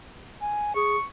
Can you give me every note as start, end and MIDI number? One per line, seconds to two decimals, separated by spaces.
0.41 0.73 80
0.76 0.96 68
0.76 1.04 85